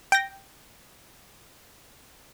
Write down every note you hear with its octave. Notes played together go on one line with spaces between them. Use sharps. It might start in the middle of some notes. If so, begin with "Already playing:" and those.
G5 A#6